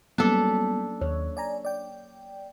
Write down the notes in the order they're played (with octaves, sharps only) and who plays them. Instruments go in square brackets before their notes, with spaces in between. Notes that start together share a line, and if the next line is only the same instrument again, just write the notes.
[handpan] F#3 A#3 C#4 [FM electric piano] G3 B3 [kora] D4 A4
[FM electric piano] D#2 [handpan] C#5
[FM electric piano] D5 G#5 A#5
D5 G5